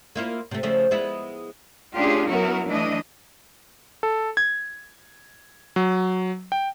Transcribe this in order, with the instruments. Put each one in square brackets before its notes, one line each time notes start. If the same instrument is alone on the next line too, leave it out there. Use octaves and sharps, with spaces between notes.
[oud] A#3 E4 F4
C3 A3
C#3 F3 A3
G#3 B3 E4
[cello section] A3 C#4 D4 F4 G4 G#4
F#3 B3 C#4 E4 F#4 A#4
E3 F#3 A3 D4 E4 D#5
[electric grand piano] A4
G#6
F#3
G5